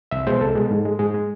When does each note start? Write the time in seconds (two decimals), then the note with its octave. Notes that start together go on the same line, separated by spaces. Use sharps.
0.11 C2 E5
0.27 B2 G#3 C5
0.41 C2 A4
0.55 B2 G#3
0.71 G#2
0.85 G#3
0.99 G#2 G#4
1.14 G#3